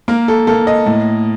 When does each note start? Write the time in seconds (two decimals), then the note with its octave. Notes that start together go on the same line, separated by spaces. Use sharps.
0.08 A#3 A#4
0.28 A4
0.47 A#3 A4
0.67 D#5
0.86 A2